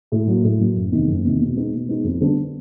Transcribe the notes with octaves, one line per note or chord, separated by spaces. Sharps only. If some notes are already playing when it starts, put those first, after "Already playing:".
A2
F#3 A#3
A2
F#3 A#3
F#1
E2 C3 D#3
F#1
E2 C3 D#3
B2
G#3 B3 D#4
B2
G#3 B3 D#4
F2
D3 G3 B3 D4